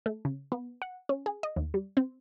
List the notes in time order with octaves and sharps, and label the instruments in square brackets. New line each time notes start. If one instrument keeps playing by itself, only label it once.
[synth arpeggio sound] A3
C#3
B3
F#5
C#4
G#4
D#5
D#2
G3
C4